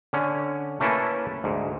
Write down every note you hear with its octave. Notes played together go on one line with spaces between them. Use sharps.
D3 C#4
A3 A#3 C#4 E4 A4 B4
D2 G#2